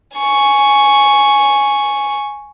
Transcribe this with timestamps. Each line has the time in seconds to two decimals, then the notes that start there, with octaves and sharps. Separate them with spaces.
0.17 G#5 C#6